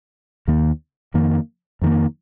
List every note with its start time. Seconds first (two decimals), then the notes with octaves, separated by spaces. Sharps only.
0.48 D#2 D#3 A#3
1.14 F2 D#3 A#3
1.82 F2 D#3 A#3